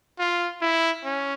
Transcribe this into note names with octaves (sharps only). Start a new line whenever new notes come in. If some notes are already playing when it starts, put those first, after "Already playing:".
F4
E4
C#4